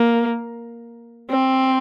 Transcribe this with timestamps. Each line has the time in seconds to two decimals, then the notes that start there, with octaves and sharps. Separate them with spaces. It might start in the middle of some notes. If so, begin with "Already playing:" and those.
Already playing: A#3
1.30 C4